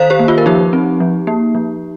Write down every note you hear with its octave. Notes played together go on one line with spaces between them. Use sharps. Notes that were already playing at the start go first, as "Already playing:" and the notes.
Already playing: D#3 C5 F5
G4 C5
A#3
F4
A#4
F3 D#4 G4
C4
F3
A#3
F3